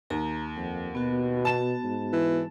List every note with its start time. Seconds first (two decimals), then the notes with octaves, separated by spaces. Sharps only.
0.10 D#2 A#5
0.56 F2 F#5
0.95 B2 B3 F#4
1.45 A5 E7
1.83 G#2
2.13 E3